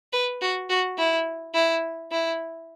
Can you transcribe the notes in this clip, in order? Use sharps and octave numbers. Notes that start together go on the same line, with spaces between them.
B4
F#4
F#4
E4
E4
E4